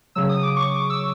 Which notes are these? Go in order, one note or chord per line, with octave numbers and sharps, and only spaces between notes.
C#3 F#3 E6
D#6
D6
C#6
D6
E6